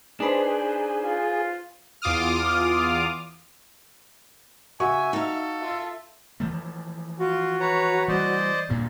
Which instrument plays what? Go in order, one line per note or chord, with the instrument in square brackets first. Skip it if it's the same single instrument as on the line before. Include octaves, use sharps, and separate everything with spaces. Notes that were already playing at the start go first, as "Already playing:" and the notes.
[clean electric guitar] D4 [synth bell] D#4 B4 C5 [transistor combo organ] G#4
[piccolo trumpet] F4
[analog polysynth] E2 F4 D6 D#6 F6
[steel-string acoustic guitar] C#3 [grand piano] F#4 C#6 [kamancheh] E5 [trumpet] G#5
[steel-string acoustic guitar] D#4 F5 [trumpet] A4
[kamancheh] F4 E5
[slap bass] E3 F3 A3
[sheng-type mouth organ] F4 [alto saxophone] F#4
[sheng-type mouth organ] B4 C#5 A#5
[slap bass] E3 G3 [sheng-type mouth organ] C5 D5 D#5
[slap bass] D2 G2 A#2